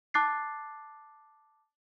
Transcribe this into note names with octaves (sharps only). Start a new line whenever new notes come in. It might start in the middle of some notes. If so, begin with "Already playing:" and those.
A5 D6 F#6 A6 C7